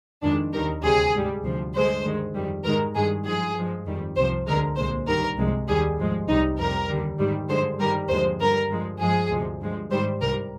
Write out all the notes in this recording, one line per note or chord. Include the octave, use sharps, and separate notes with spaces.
F2 D#3 G#3 D4
D#2 D#3 G3 A#4
D2 C3 G3 G#4
G#2 G3
D2 C3 F3
G2 D3 G#3 C5
G2 D#3 G#3
F2 D#3 G3
G#2 D#3 G#3 A#4
G2 D#3 G#3 G#4
G#2 F3 G#3 G#4
G2 F3 G#3
F2 D#3 G3
C2 C3 F3 C5
D2 D3 G#3 A#4
C2 A#2 G#3 C5
G2 D#3 G3 A#4
C2 C3 F3 G#3
D#2 D#3 G3 G#4
G#2 F3 G#3
C2 C3 G3 D#4
F2 C3 G3 A#4
D#2 D3 G3
G#2 D#3 G3
G2 D3 F3 G#3 C5
G2 D#3 G3 A#4
D#2 D3 F3 G#3 C5
G2 D3 G3 A#4
G2 F3 G#3
G2 F3 G#3 G#4
D2 C3 F3 G#3
G2 F3 G#3
G#2 D#3 G3 C5
C2 C3 G3 A#4